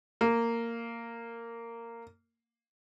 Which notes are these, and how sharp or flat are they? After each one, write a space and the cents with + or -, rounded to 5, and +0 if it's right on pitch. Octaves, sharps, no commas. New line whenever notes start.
A#3 -10